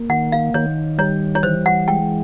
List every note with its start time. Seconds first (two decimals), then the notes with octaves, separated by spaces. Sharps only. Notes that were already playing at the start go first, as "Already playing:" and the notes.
Already playing: A#3
0.09 D#3 F#5
0.32 F5
0.54 D#3 C#5
0.98 G3 C#5
1.35 C#5
1.43 E3 C5
1.66 F#5
1.88 G#3 G5